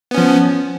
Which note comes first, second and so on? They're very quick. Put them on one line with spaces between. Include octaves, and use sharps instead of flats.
B3 C#4 F3